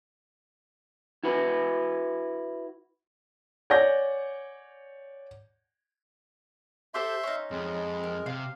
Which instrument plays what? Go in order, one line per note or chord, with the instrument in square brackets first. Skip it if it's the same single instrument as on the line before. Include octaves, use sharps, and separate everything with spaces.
[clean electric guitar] E4 F#4 B4
[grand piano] C#5 D5 F#5 G#5 G6 A#6
[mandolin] G4 A4 C5 [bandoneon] E5 C6
[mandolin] C#4 D#4
[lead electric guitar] F2 [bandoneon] G#3
[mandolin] A#4
[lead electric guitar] C3 [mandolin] F5